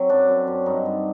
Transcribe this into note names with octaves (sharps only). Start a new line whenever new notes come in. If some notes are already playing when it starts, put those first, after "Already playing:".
Already playing: F#3 C4
F#2 D4
F#2
F#2
G2 D#4
G2